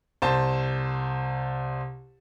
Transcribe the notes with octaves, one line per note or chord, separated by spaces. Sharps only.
C2 C5 A5